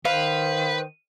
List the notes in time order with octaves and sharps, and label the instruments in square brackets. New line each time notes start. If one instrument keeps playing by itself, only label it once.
[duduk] D#3 [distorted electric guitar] B4 [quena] C5 [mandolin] F5